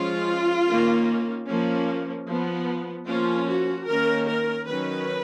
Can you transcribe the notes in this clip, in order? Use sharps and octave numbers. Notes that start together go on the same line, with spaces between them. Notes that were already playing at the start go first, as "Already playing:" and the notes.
Already playing: F3 G#3 C#4 F4
D#3 A#3 C#4
F3 A#3 C#4
F3 B3
F3 A#3 C#4 F4
F#4
D#3 A#3 C#4 A#4
A#4
D#3 F#3 C#4 B4